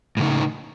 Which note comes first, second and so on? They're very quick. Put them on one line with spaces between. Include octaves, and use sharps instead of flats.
A2 C#3 D#4